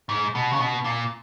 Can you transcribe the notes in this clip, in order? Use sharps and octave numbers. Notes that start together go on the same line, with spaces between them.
G#2
B2
C#3
B2
A#2